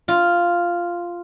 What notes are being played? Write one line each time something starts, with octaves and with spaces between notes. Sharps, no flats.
F4